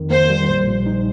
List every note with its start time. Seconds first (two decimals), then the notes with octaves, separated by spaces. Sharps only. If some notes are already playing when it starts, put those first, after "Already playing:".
Already playing: F2 D#3
0.10 A#3 C5
0.30 G3
0.48 A#1
0.67 A#2
0.86 D#4